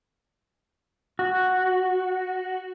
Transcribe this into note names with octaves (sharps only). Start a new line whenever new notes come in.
F#4